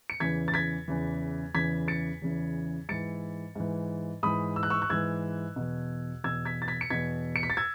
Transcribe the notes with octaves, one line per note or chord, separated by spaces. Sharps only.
C#7
E2 C#3 E3 G#6 B6
A6
G#6 B6
E2 C#3 E3
E2 C#3 E3 G#6 B6
A6 C#7
E2 C#3 E3
G#2 E3 A6 C#7
G#2 E3
G#2 E3 B5 D#6
E6
F#6
C#6 E6
F#6
G#2 E3 E6 G#6
E2 B2
E2 B2 E6 G#6
G#6 B6
A6
G#6 B6
C#7
E2 B2 G#6 B6
C#7
B6
A6
E6 G#6